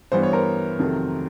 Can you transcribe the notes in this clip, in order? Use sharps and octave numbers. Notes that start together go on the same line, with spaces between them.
G2 E3 G3 B3 C5
C#5
A#4 C5
F2 C3 D#3 F#3 A3